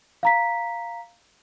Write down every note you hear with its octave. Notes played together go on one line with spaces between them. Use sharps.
F5 A#5 B6